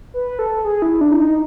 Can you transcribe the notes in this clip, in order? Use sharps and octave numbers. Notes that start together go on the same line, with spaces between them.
B4
A4
G#4
E4
D4
E4
D#4